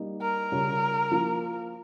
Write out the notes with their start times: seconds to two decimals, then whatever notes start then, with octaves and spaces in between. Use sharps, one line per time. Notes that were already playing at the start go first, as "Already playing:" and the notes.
Already playing: G3 A#3 D#4
0.21 A#4
0.51 C#3 G3 C#4 F4
1.11 F3 A#3 F4